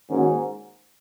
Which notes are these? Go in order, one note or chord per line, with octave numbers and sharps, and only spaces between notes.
G#2 D#3 A#3 C#4 F#4 A#4